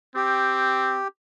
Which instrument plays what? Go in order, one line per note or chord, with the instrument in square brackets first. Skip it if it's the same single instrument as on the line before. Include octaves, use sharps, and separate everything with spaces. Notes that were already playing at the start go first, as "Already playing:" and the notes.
[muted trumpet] C4 [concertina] G4